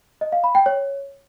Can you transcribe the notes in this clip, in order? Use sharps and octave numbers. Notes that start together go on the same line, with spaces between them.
D#5
F5
B5
G5
C#5